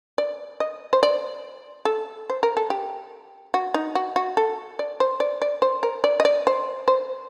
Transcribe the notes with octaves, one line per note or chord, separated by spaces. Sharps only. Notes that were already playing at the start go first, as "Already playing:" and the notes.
D5
D#5
C5
D5
A4
C5
A#4
A4
G4
F#4
D#4
F#4
F#4
A4
D5
C5
D5
D5
C5
A#4
D5
D#5
D5
C5
C5